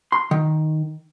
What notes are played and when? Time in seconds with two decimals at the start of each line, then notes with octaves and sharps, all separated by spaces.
0.12 C6
0.31 D#3